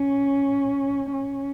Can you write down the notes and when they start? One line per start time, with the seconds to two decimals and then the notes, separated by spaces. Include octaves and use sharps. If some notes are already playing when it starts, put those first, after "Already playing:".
Already playing: C#4
1.12 C#4